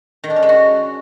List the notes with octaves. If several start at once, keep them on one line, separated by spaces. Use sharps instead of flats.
D#3
D4
C#4
G#3
F#4